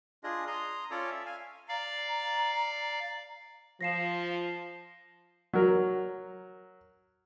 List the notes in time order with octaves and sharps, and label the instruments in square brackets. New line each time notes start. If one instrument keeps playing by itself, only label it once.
[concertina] D4 F4 G#4 D#5
A#5 C6 D#6
C#4 F4 A4 C#5 D5
E5
F5 G#5
[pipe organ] D5 F5 [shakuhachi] A#5
[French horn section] F3 [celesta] A#6 C7 E7
[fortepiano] F#3 A#4